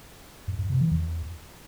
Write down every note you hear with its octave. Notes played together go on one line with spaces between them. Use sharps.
F#2
F#2
C3
E3
E2